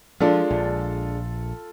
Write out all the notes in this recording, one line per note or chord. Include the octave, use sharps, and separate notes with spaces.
F3 G#3 D4 F4 A4
A#1